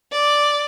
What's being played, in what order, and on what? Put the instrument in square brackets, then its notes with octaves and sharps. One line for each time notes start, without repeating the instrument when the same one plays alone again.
[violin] D5